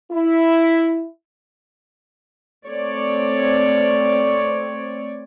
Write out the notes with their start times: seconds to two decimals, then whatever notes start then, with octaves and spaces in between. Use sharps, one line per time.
0.12 E4
2.67 A3 C4 C#5 D5